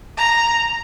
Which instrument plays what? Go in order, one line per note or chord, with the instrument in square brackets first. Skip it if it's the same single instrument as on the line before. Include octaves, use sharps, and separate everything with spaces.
[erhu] A#5